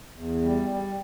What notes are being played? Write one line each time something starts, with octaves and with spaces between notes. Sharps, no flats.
E2
G3
G3